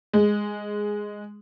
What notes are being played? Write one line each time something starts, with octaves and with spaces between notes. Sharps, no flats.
G#3